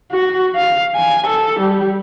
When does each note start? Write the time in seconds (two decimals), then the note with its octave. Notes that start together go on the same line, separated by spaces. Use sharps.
0.12 F#4
0.55 F5
0.96 G#5
1.27 A4
1.60 G3